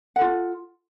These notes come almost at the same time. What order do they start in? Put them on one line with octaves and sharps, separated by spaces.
F#5 A4 F4